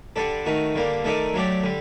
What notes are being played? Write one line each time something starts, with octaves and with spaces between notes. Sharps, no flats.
D3 G3 D4 A4 D5
D#3 A3 D#4 F#4
D3 G3 A#3 D4
D#3 A3 D#4 A4 D5
F#3 A3 D4 G4 D5
D3 G3